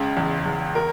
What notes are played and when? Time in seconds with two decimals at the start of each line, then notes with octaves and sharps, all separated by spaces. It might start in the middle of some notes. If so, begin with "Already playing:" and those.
Already playing: C#2 C#3
0.17 E2
0.46 E2
0.75 A#4